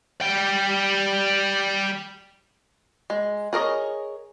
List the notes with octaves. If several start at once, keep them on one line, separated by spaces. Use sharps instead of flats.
G3 G5
G#3
G#4 A#4 C#5 D#5